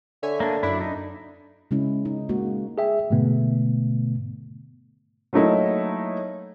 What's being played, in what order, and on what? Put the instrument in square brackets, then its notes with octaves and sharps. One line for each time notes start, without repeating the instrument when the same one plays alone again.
[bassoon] D3 [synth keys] C#5 E5 G#5
[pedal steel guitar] A#3 D4
[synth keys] F#2 D4 [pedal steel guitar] E4
[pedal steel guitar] D#4
[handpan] C#3 G#3 C#4 E4
D#4
G#3 A#3 F#4
[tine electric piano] G#4 E5 G5
G#2 B2 D3 A3 B3
[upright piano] F#3 A3 A#3 D#4 E4